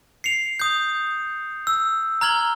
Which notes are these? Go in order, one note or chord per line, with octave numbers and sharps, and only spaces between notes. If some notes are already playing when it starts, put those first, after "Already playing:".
C7 C#7 F7
D#6 G6
E6
A#5 F6 G#6 F#7 G7